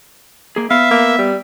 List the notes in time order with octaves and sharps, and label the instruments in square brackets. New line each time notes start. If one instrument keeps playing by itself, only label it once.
[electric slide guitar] A#3 G#4
[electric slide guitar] B3 [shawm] E5 [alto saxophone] F5
[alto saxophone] A#3
G3